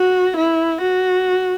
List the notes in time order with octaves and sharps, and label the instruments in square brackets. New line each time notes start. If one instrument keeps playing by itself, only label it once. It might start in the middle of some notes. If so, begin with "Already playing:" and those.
Already playing: [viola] F#4
E4
F#4